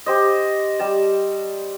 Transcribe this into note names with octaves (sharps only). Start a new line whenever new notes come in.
G4 C5 D#5
G3 A5